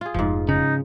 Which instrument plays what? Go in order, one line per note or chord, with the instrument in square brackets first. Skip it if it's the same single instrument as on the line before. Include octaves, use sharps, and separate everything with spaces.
[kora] F4 G#4
[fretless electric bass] F1 [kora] G#2 F3
[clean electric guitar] C#3 [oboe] D#4